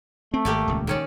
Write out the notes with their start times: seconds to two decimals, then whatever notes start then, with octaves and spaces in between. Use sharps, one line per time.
0.34 A3 C4
0.45 G#1 A#3 G4 D5
0.68 D#1 C#2
0.87 D#3 C#4 D5